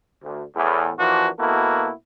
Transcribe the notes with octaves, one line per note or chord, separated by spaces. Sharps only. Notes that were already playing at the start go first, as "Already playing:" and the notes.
D2
E2 A2
E3 F3 A#3 D4 F#4
B2 A#3 E4 F#4 A4